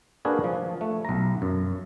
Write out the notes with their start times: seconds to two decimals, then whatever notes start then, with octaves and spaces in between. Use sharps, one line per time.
0.25 A#3 D4 F#4 G#4 A#4 B4
0.44 F3
0.81 A3
1.05 B1 A#5
1.42 F#2